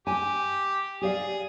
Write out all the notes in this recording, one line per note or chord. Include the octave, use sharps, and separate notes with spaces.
G4 G#5
G4 G#4 D5 F5